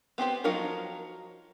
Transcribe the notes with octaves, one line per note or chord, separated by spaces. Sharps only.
B3 C4 G4 C5
F3 F#3 D#4 F4 A#4